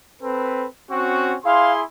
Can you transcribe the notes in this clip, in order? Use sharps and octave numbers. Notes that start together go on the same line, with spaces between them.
C4 A4 B4
C4 C#4 F#4
E4 G#4 F5 C6